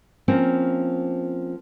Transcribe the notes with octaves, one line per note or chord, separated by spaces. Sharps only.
F3 A#3 C4 C#4